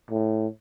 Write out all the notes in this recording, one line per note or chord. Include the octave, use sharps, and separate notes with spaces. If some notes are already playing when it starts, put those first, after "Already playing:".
A2